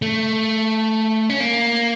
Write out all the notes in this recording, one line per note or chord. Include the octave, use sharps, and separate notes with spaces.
A3
C#4
A#3